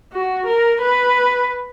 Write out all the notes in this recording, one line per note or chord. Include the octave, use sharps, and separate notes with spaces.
F#4
A#4
B4